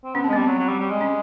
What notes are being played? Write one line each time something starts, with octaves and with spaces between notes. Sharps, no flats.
C4
B3 C#4
C4
G#3
G3 B3
F#3 C4
F#3
G3
G3
G#3
C#4